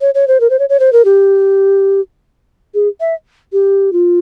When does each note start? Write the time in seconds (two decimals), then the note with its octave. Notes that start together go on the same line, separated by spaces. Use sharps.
0.01 C#5
0.15 C#5
0.28 C5
0.40 A#4
0.50 C5
0.59 C#5
0.69 C#5
0.80 C5
0.93 A#4
1.05 G4
2.74 G#4
3.00 E5
3.53 G4
3.93 F4